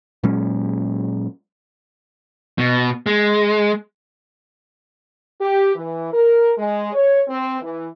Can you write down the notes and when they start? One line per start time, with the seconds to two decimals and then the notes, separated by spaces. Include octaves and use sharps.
0.23 A#2 F#3 G#3 C#4
2.58 B2
3.06 G#3
5.40 G4
5.75 E3
6.13 A#4
6.58 G#3
6.93 C#5
7.28 C4
7.62 E3